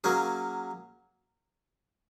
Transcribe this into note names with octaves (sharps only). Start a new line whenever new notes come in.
F#3 A#3 C#4 G#4